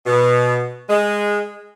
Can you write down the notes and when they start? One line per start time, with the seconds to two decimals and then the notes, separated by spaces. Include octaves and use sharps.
0.06 B2
0.90 G#3